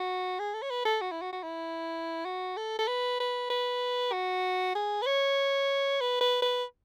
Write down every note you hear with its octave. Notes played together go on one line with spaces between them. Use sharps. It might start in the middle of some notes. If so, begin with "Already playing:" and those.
Already playing: F#4
G#4
A4
C#5
B4
A4
F#4
E4
F#4
F#4
E4
F#4
A4
A4
B4
B4
B4
F#4
G#4
B4
C#5
B4
B4
B4